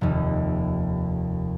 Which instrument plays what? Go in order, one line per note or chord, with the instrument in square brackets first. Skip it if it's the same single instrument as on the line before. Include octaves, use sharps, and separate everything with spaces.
[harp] F1 D#2